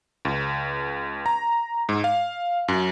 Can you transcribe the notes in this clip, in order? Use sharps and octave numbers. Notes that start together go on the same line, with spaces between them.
C#2
A#5
G#2
F5
F#2